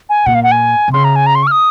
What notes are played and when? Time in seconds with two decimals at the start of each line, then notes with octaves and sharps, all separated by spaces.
0.09 G#5
0.26 A#2 F#5
0.35 F5
0.43 F#5
0.52 G#5
0.88 C3
0.93 C#3 C6
1.04 A#5
1.16 G#5
1.26 A#5
1.35 C6
1.43 C#6
1.47 F6
1.51 D#6